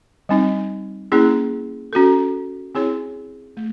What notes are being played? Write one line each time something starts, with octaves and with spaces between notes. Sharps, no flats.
G3 C4 D#4
A#3 C#4 E4 G#4
C#4 F#4 A4
C4 E4 G#4 C#5
A3